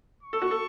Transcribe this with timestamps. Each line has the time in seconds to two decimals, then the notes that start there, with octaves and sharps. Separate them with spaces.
0.23 C#6
0.33 A4
0.42 F#4
0.51 A4